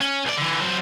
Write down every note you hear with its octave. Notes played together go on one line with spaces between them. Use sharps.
C#4
B1 D5
D3 E3
F#2 C4